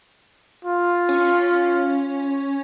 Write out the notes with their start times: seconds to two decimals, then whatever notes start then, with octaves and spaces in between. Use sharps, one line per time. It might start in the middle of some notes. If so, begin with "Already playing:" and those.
0.65 F4
1.09 C#4